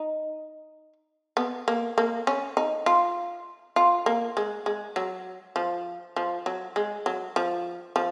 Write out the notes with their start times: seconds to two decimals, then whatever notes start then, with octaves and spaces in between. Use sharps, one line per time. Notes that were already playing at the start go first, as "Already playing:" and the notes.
Already playing: D#4
1.37 B3
1.68 A#3
1.98 A#3
2.27 C#4
2.57 D#4
2.86 F4
3.76 F4
4.06 A#3
4.37 G#3
4.66 G#3
4.96 F#3
5.56 F3
6.16 F3
6.46 F#3
6.76 G#3
7.06 F#3
7.36 F3
7.96 F3